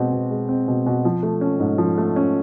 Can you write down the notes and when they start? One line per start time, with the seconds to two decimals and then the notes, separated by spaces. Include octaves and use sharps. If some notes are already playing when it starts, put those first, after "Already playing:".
Already playing: B2 G#3 C4
0.12 B2
0.31 G#3
0.49 C4
0.68 B2
0.86 B2
1.05 F3
1.23 A3
1.41 C#4
1.60 G#2
1.78 F3
1.98 A3
2.16 C#4